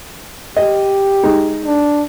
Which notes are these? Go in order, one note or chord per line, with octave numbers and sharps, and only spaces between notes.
G4 D#5
G#3 D#4
D4